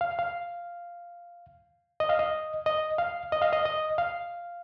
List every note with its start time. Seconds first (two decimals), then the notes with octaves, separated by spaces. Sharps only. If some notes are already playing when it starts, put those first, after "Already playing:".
0.01 F5
0.19 F5
2.00 D#5
2.09 F5
2.19 D#5
2.66 D#5
2.98 F5
3.32 D#5
3.42 F5
3.53 D#5
3.65 D#5
3.98 F5